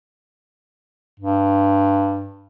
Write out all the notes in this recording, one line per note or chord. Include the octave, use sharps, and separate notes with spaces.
G2